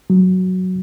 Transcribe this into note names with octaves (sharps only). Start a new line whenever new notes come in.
F#3